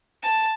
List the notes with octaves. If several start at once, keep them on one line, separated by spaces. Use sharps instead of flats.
A5